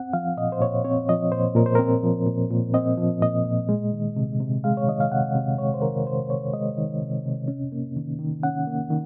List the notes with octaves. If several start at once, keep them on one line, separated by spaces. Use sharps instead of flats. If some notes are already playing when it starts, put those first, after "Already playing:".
Already playing: C4 F#5
F3 F5
A#2 D#5
C5
A#2 C#5
C4 C#5
F3 D#5
A#2 C5
A#2 A#4
C5
C4 A#4
F3
A#2
A#2
C4 D#5
F3
A#2 D#5
A#2
G#3
D#3
C3
C3
G#3 F5
C#5
D#3 D#5
F5
C3 F#5
C3
G#3 C#5
C5
D#3 A#4
C3 C5
C3 C#5
G#3 D#5
D#3
C3
C3
C#4
A#3
D#3
D#3
C#4 F#5
A#3
D#3